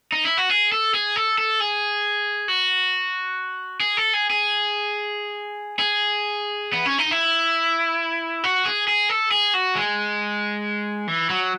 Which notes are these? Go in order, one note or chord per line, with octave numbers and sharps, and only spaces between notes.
D#4
E4
F#4
G#4
A4
G#4
A4
A4
G#4
F#4
G#4
A4
G#4
G#4
G#4
B3
C#4
D#4
E4
F#4
G#4
G#4
A4
G#4
F#4
G#3
E3
F#3